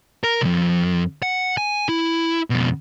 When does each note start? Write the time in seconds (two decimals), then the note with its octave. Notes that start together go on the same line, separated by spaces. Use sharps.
0.24 A#4
0.42 C2 F2
1.23 F#5
1.57 G#5
1.89 E4
2.50 F2 B2